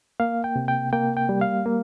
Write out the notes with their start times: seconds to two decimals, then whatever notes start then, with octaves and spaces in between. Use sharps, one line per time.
0.20 A#3 F5
0.44 G5
0.56 C3
0.68 G5
0.93 A#3 G5
1.17 G5
1.29 G3
1.41 F5
1.66 A#3